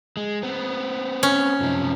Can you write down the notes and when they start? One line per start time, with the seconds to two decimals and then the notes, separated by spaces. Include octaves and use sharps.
0.17 G#3
0.43 B3 C4
1.23 C#4
1.60 F#2 C3 F3